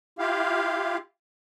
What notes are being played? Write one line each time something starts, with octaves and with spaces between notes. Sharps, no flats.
E4 F4 G4 F5